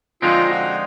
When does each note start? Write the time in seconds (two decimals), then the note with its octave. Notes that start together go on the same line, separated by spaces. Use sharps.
0.22 D3 F3 G#3 C4 D#4 F4
0.48 F#4